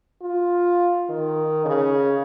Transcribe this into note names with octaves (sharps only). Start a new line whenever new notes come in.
F4
D#3
C#3